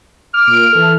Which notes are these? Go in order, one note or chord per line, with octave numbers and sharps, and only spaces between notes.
D6 F6
A#2 D7
E3 A4